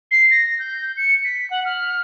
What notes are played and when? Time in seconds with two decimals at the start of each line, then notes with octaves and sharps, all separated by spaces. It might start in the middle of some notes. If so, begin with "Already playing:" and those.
0.11 C7
0.30 A#6
0.58 G6
0.96 C#7
1.24 B6
1.50 F#5
1.65 F6